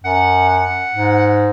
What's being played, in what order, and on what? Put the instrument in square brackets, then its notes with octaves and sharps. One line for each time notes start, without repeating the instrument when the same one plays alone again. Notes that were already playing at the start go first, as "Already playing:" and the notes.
[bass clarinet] F#2 [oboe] F#5
[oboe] F#5
[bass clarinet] G#2